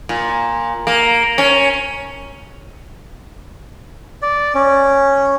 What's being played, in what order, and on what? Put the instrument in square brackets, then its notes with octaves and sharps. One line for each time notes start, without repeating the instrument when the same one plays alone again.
[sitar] A#2
A#3
C#4
[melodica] D5
C#4